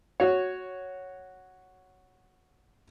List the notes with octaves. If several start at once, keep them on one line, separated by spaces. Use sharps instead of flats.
F#4 C#5